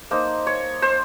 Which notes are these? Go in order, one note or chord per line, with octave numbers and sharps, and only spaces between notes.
A#3 D#4 C5
C#5
C5